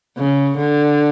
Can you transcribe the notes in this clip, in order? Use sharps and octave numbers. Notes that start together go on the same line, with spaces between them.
C#3
D3